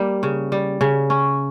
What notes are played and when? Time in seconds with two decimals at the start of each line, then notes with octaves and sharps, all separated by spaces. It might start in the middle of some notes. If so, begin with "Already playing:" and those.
Already playing: G3 A#3
0.23 C#3
0.52 G3
0.81 C#3
1.10 C#4